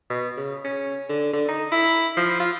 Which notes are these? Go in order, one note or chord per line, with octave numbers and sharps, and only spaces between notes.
B2
C#3
C#4
D3
D3
D#4
E4
F3
F4